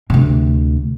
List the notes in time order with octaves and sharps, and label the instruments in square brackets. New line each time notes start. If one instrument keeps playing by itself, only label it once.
[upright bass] D2 C3